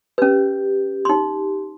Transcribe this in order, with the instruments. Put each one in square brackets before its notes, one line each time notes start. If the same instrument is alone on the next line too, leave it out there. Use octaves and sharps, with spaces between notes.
[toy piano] C#4 B4 [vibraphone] G4
[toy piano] D#4 C6